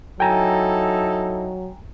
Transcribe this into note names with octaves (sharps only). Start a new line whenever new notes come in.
F#3 D#4 E4 A4 G5 G#5 A#5